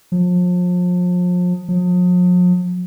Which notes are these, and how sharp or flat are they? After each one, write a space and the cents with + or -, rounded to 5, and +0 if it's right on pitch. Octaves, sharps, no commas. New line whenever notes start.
F3 +35
F3 +45